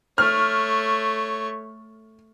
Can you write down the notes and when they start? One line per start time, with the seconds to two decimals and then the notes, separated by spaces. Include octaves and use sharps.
0.18 A3 C#5 F6